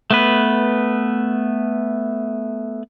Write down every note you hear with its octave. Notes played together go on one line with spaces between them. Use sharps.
A3 B3 B4